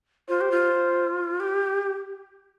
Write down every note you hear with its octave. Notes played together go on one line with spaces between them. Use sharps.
F4 C5
G4
F4
G4